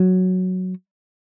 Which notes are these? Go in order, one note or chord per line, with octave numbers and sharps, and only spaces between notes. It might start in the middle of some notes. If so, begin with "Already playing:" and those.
Already playing: F#3